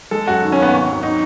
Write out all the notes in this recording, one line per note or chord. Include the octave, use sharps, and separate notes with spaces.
G#3 A4
F#2 F#4
D#3
C#4
D#2
B3
G#1
F#3
D#4